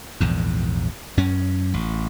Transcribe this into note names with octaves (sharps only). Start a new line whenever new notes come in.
A#1 E2 G#2
F#2 C#4
A1